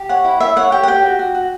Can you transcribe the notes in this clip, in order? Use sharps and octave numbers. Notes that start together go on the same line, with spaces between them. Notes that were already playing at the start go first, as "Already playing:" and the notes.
Already playing: G4
C#5 F#5
E4
C#5 E5
C#5 F#5
G4 G5
F#5
G4 G5
F#4
F#4
F#4